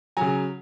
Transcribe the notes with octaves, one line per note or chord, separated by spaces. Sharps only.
C#3 F#3 G#5 A#5